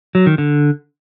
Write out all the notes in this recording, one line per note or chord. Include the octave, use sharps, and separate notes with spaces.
F#3
D#3
D3